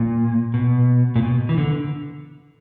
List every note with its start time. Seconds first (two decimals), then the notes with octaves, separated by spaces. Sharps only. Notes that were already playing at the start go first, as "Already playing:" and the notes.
Already playing: A#2
0.54 B2
1.16 A#2
1.23 B2
1.49 E3
1.58 D3